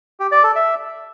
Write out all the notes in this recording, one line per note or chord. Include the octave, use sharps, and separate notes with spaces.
G4
D5
A4
E5